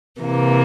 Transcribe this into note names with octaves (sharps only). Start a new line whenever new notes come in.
C3 E3 A#3